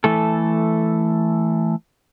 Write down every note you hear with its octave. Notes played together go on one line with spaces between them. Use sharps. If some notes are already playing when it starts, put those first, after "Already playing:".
E3 A3 A4